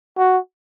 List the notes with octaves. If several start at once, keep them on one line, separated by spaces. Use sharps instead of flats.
F#4